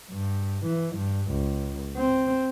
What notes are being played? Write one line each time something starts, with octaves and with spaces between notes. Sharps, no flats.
G2
E3
G2
C#2
C4